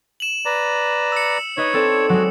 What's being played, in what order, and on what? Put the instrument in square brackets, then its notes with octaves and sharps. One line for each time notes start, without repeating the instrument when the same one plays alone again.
[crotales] E7 F#7
[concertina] B4 D5 A#5
[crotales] E6 C#7
[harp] D#4 B4 D#5 [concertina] C#5
[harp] C4 A4 D5
[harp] F#3 G#3 [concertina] F#4